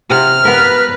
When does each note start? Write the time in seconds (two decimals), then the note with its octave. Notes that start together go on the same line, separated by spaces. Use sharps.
0.10 C3 F#5 F6
0.45 B3 A#4 B4